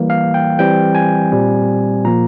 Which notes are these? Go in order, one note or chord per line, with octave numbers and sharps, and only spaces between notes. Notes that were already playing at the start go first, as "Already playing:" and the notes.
Already playing: E3 G3 A#3
F5
G5
E3 G3 C4 G5
G#5
A#2 G3 C4
A#2 F3 A#3 A#5